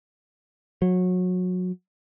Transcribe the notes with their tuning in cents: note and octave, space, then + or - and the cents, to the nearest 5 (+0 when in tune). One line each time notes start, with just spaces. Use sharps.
F#3 -25